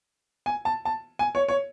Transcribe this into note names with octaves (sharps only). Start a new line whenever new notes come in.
G#5
A5
A5
G#5
C#5
C#5